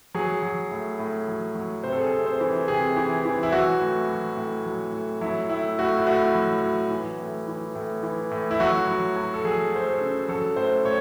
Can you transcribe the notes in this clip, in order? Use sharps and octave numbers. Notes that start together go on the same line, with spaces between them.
F#3 G#4
F#3
A2
A2
F#3
F#3
C3 C5
A4
G#4
A4
C3
C5
E3
C3 G#4
E3
E3
E4
F#3 F#4
A2
F#3
A2
F#3
A2
F#3 E4
A2 E4
A2 F#4
E4
A2 F#4
F#3
F#3
E3
A2
E3
A2
E3
A2
E4
F#3 F#4
F#3
F#3
A4
F#3 G#4
F#3 C5
A4
C#3
F#3 A4
A2 C5
A2 C#5